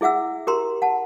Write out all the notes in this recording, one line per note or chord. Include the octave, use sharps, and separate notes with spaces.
E4 G#4 E5 F#5 E6
G4 A#4 A#5 C6
F#5 A5